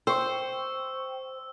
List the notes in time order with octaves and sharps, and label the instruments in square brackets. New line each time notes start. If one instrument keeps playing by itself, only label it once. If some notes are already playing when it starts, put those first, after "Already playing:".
[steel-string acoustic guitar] C5 [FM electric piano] G5 C#6 [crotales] E6